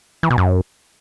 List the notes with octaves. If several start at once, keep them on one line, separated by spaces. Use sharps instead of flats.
E3
B2
F#2